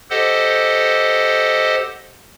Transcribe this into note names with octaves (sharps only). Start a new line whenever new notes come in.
G4 A4 C5 D#5 F#5